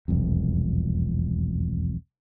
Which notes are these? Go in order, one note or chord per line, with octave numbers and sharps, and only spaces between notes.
E1 C2 F2